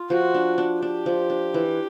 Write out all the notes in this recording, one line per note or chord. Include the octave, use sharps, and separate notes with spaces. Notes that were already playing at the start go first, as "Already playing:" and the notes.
Already playing: F4
F3 F#4
D4
D4
D4 G4
F3
D4
E3